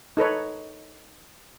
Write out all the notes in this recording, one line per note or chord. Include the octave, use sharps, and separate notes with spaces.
D#4 A4 B4 C#5